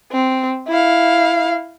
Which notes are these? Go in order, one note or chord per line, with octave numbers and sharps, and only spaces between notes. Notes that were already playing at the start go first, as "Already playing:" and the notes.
C4
E4 F5